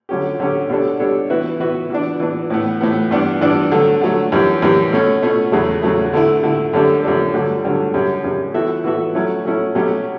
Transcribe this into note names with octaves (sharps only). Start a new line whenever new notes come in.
D3 F#3 C#4 G4
D3 F#3 C#4 G4
B2 G3 D4 A4 C#5
B2 G3 D4 A4 C#5
E3 B3 F#4 B4 E5
E3 B3 F#4 B4 E5
E3 B3 D4
E3 B3 D4
A2 E3 B3
A2 E3 B3
G2 E3 B3 D4
G2 E3 B3 D4
D3 F#3 A3
D3 F#3 A3
F#2 E3 G3
F#2 E3 G3
B2 A3 C#4
B2 A3 C#4
E2 C#3 F#3 A3
E2 C#3 F#3 A3
D3 A3 E4
D3 A3 E4
F#2 D3 G3 D4 A4
F#2 D3 G3 D4 A4
G2 D3 F#3 A3 D4
G2 D3 F#3 A3 D4
F#2 C#3 G3
F#2 C#3 G3
E3 B3 F#4 A4 E5
E3 B3 F#4 A4 E5
F#3 A3 C#4 E4
F#3 A3 C#4 E4
B2 F#3 A3 C#4 G4